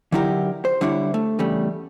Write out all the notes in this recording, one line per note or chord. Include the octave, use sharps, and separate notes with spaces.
D3 F#3 D#4 E4 G4 A#4
C5
D3 G3 D4 E4 C#5
A3
E2 C#3 G3 A3